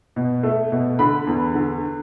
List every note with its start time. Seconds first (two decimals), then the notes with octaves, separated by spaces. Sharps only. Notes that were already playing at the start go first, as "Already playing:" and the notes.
0.16 B2
0.43 A3
0.72 B2
0.99 D3 B5
1.27 E2
1.55 D3